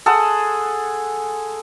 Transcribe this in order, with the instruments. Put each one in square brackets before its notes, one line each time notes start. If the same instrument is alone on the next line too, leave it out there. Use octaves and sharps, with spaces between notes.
[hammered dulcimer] G#4 A4 F#5 C6